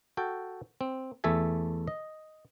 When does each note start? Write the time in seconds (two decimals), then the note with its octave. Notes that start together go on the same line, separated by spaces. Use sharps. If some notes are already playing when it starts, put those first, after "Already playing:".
0.17 F#4 A4 G5
0.81 C4
1.24 E2 A3 A4 E5 G#5
1.87 D#5